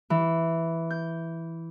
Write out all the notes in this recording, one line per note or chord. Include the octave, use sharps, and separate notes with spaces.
E3
G6